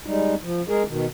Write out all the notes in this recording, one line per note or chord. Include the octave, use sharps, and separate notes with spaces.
G3 G#3 D#4
F3
G#3 G#4 A#4
B2 D#3